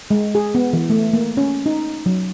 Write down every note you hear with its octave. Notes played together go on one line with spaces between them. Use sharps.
G#3
G#4
B3
E3
A3
A#3
C#4
D#4
F#3